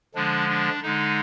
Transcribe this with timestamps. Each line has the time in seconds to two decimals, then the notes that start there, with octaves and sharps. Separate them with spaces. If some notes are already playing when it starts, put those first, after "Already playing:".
0.15 D3 F3 G#3 D4
0.49 D4
0.83 D3 G#3 D#4